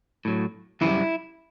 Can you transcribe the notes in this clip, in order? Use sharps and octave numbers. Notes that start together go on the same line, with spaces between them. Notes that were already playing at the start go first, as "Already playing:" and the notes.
A2 F#3
F#2 E3 G3 E4